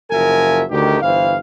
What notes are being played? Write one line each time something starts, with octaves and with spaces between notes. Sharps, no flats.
F#1 F3 F#4 A#4 E5 G#5
D2 D#3 G4
G1 E3 C5 F5